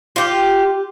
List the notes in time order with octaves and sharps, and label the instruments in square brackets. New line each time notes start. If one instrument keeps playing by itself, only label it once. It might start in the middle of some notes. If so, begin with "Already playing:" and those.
[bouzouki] F4 G4